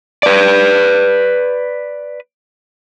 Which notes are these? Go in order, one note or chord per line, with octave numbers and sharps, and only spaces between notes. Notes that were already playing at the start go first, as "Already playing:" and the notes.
B4 D5